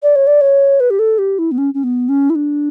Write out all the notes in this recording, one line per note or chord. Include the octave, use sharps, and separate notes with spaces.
D5
C#5
D5
C#5
B4
G4
A4
G4
E4
B3
C#4
C#4
B3
C#4
E4
D4